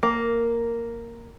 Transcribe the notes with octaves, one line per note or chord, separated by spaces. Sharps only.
A#3